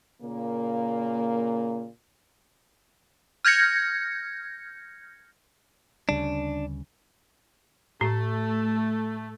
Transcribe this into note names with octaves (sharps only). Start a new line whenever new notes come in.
A#2 C#3 A#3
F6 G6 G#6 A#6 C#7
D2 C#3 G3 D4
A2 A3